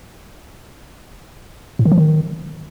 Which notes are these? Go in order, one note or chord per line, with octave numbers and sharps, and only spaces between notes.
A2
D#3
F3
D#3